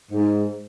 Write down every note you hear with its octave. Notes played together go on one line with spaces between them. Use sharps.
G#2